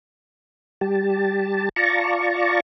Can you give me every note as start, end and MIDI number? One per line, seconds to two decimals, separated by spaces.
0.81 1.69 55
0.81 1.69 67
0.81 1.69 81
1.76 2.60 65
1.76 2.60 74
1.76 2.60 81
1.76 2.60 82
1.76 2.60 85